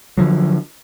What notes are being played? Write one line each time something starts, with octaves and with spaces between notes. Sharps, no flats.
D3 F3 F#3